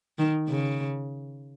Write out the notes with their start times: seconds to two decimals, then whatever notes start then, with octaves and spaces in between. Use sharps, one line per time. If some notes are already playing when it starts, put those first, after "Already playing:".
0.19 D#3
0.48 C#3